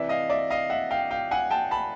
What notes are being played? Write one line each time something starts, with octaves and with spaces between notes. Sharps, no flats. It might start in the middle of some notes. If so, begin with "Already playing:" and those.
Already playing: C3 E3 D5 E5
D#5 F5
D5 E5
D#5 F5
E5 F#5
F5 G5
F5 G5
F#5 G#5
G5 A5
A5 B5